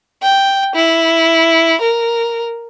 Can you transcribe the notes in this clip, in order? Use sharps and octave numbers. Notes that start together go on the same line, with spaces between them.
G5
E4
A#4